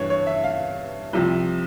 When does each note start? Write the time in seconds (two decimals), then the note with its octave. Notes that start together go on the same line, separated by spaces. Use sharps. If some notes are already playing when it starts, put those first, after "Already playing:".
Already playing: G2 E3 C#5
0.10 C#5
0.27 E5
0.44 F5
1.13 C2 C3 F3